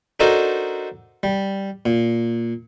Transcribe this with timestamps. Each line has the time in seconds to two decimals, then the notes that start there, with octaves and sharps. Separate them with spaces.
0.20 D4 D#4 F#4 A4 A#4 C5
1.23 G3
1.86 A#2